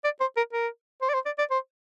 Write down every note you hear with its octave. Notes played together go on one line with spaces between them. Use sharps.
D5
C5
A#4
A#4
C5
D5
C5
D5
D5
C5